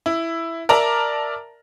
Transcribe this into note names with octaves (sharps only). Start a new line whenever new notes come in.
E4
A#4 D5 E5 A5 A#5